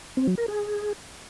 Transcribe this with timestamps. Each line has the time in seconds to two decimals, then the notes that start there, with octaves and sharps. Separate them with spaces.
0.17 C4
0.27 F#3
0.38 A#4
0.48 G#4